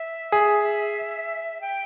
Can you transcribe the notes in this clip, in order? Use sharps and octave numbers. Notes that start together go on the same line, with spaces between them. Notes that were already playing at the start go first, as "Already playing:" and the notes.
Already playing: E5
G#4
G5